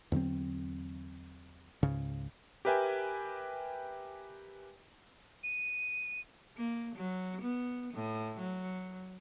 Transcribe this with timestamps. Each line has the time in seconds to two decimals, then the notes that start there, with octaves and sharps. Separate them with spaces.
0.12 E2 D3 F#3 C4
1.83 C#2 G#2 C#3
2.65 G4 A#4 B4 E5 G5 G#5
5.43 D#7
6.57 A#3
6.95 F#3
7.42 B3
7.94 A2
8.38 F#3